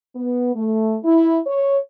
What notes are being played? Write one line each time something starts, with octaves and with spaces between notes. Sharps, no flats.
B3
A3
E4
C#5